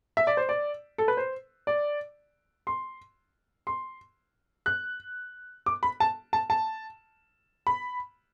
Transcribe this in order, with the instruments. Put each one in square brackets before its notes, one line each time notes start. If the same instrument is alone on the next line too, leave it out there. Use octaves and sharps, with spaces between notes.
[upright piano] E5
D5
C5
D5
A4
B4
C5
D5
C6
C6
F#6
D6
B5
A5
A5
A5
B5